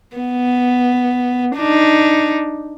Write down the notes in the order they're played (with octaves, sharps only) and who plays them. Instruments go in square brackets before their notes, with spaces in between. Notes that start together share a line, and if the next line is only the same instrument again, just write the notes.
[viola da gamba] B3
D4 D#4